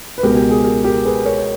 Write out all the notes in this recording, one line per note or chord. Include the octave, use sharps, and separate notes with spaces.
B4
C#2 B2 G#3 G4 A#4
G4
G#4
G4 A#4
G4 A#4
G#4 B4
A#4 C#5